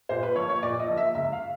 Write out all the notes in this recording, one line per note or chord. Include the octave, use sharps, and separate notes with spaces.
A#2 C5
B4
F3 A#3 C#5
C#5
A#2 D5
D#5
F3 A#3
E5
C#2 E5
F5